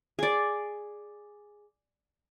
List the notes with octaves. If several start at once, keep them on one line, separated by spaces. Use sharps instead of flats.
G#4 D5